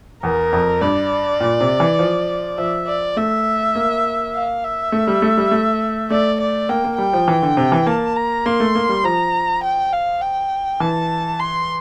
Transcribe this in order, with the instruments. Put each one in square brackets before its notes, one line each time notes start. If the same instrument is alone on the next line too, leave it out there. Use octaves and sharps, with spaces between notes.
[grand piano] E2 [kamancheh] A#4
[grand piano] F2
[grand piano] G2 [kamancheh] D5
[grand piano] A#2
C3
E3
F3
[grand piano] F3 [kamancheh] E5
[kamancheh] D5
[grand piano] A3 [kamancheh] E5
[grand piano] A#3
[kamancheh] F5
E5
[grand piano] A3
G3
A3
G3
A3
[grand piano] A3 [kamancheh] D5
[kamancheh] D5
[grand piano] A#3 [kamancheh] G5
[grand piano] A#3
[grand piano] G3 [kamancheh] G5
[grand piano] F3
E3
D3
C3
E3
[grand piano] A#3 [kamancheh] A5
[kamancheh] A#5
[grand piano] A#3 [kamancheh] C6
[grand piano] A3
A#3
G3
[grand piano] F3 [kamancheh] A#5
[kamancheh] G5
F5
G5
[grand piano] E3 [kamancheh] A5
[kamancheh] C6